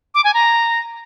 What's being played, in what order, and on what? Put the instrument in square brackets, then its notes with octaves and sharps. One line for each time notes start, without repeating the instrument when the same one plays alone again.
[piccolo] D6
G#5
A#5